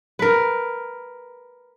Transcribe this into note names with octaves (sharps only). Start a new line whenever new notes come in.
A#4 B4